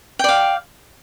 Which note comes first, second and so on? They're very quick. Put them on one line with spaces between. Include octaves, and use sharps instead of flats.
G5 D5 F5